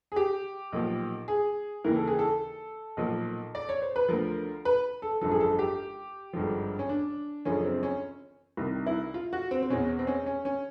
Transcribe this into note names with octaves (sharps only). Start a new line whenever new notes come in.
G#4
G4
B1 A#2 F3
G#4
D#2 C#3 E3 A#4
A4
G#4
A4
B1 A#2 F3
D5
C#5
C5
B4
D2 D3 F3 A#4
B4
A4
G#1 F#2 D3 F3 A4
G#4
A4
G4
G#1 G2 D3 F3
C#4
D4
F#1 F#2 D3 F3 C#4
C4
C#4
C2 C3 D#3
E4
F4
F#4
C4
C4
E2 B2 C#4
C4
C#4
C#4
C#4